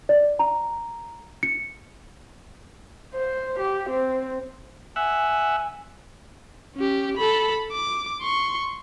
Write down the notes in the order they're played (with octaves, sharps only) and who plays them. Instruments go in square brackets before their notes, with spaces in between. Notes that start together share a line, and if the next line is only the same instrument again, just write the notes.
[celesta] D5
A#5
C#7
[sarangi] C5
G4
C4
[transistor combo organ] E5 F#5 [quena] G#5
[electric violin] C#4 G4
A4 B5
D6
C6 C#6